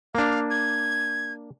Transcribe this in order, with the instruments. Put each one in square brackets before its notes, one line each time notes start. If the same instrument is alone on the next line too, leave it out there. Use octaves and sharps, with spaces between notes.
[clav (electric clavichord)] A#3 D4 [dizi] F5
[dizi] G#6